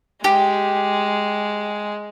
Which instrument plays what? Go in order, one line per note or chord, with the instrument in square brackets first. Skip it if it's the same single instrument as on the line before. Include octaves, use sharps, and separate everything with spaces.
[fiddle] G#3 [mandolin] G4